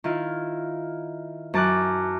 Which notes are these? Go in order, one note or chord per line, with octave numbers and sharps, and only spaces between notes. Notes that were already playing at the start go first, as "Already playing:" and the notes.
D#3 E4 F4
F#2 A5 D6 F#6